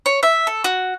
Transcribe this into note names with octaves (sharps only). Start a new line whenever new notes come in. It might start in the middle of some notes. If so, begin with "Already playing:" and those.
C#5
E5
A4
F#4